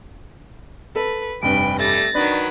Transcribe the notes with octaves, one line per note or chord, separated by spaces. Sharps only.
A4 B4
F1 G2 B4 G5 D7
G3 A3 A6 A#6
D#3 F#3 D4 B4